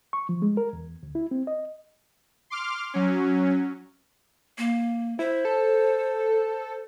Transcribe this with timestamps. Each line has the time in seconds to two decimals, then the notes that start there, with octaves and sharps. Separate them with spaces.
0.13 C#6
0.29 F3
0.42 G#3
0.57 A#4
0.73 E2
1.03 D2
1.15 E4
1.31 C4
1.47 D#5
2.50 C6 D6 F6
2.94 F#3 C#4
4.58 A#3
5.19 E4 C5
5.45 A4